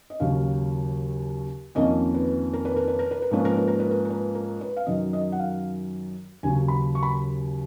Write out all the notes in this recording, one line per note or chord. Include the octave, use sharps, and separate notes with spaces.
D#5
D#2 C#3 F#3 C#4 F5
F2 D#3 A#3 C#4 D#5
B4
A#4
B4
A#4
B4
A#4
B4
A#4
G#2 F3 A#3 C#4 B4
A#4
B4
A#4
B4
A#4
A#4
B4
A#4
B4
F5
F#2 D#3 F#3 D#5
D#5
F#5
F5
D#2 C#3 F#3 C#4 G#5
B5
C#6
B5